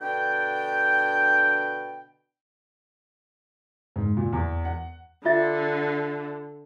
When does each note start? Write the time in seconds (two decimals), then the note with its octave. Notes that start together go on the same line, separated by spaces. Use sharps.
0.01 B2 D3 D4 G5
3.96 G#2
4.17 A#2
4.33 E2
4.65 F#5
5.25 D3 F4 E5 A6